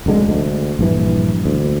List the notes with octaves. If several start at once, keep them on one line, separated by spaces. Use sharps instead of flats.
F1 D2 D3 G#3
D2
A#1 G2 E3
D2